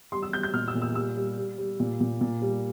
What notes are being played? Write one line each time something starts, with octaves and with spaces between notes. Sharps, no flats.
G3 C6
E6
G3 G6
G6
A#2 F6
E6
A#2
E6
G3 E6
G3
G3
G3
A#2
A#2
A#2
G3